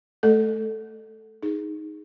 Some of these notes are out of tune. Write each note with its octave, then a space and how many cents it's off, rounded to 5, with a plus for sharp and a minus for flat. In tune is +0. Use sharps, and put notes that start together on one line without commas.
A3 -25 A4 +0 D#5 -30
D#4 +0 G#4 +0